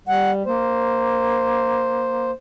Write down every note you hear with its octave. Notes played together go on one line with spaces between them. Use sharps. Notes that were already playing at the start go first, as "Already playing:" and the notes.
G3 F#5
A#3 C5